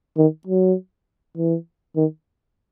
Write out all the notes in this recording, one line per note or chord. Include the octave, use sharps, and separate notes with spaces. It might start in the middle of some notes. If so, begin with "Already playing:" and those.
D#3
F#3
E3
D#3